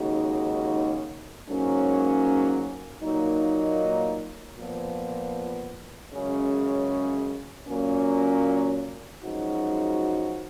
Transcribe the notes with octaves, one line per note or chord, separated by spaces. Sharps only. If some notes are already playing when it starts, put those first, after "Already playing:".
Already playing: D#2 C#3 G#3 D#4 F#4
G#2 F#3 A#3 C#4
A#2 F#3 A#3 D#4
A#2 F3 B3
F#2 C#3 G#3 C#4
A#2 F#3 A#3 C#4
F#2 F3 G#3 D#4 F#4